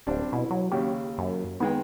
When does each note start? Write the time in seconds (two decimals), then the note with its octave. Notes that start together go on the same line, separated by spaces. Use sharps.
0.07 D1 G3 C4 D4
0.32 B2 E4
0.51 F#3
0.72 D#2 C#3 G4
1.18 F#2
1.60 D#3 G#3 B3 G5